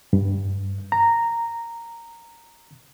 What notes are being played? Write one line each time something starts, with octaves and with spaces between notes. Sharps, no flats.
G2
A#5